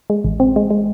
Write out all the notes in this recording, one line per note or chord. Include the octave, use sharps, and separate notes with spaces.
G#3
A1
C4
G#3
G#3